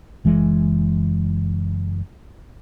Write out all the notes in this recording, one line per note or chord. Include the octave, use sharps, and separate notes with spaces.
F#1 E3 G#3